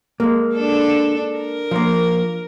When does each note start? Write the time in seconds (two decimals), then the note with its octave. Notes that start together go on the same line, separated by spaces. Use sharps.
0.20 G#3 A#3
0.55 D4 A4
1.37 A#4
1.71 F3 A#3